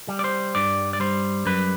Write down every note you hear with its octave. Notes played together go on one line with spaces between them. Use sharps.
G3
D5
C5
G2 D5
D5
G3 C5
F#2 B4